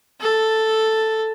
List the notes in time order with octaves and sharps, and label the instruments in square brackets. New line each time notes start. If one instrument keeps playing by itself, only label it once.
[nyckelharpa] A4